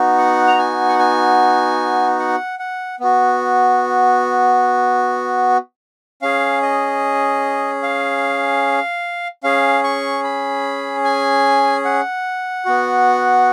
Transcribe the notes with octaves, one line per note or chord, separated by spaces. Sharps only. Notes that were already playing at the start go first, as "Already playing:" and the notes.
Already playing: B3 D#4 F#4
F#5
A#5
G#5
F#5
G#5
F#5
F#5
B3 F#4
C#4 G#4 F5
D#5
F5
C#4 G#4 F5
C#6
B5
G#5
F#5
B3 F#4